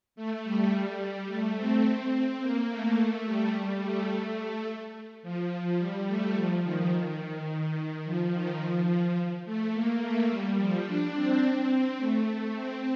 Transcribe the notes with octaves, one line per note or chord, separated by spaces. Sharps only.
A3
G3
A3
C4
C4
A#3
A3
A3
G3
A3
A3
F3
G3
A3
F3
D#3
D#3
F3
D#3
F3
A3
A#3
A3
G3
F3
D4
C4
A3
A3
C4